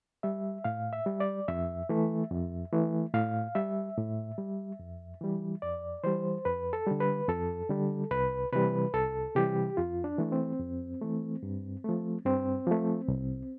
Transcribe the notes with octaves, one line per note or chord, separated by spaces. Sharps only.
G3 E5
A2 F5
E5
G3
D5
F2 E5
E3 A3
F2
E3 A3
A2 F5
G3 E5
A2
G3
F2
E3 G3
F2 D5
E3 G3 C5
F2 B4
A4
D3 G3
B4
F2 A4
D3 G3
C2 B4
C3 E3 G3 B4
C2 A4
C3 E3 G3 G4
F2 F4
D4
E3 A3
C4
F2
E3 A3
G2
F3 A3
G2 C4
F3 A3
C2